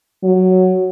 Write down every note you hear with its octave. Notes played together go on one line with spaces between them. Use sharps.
F#3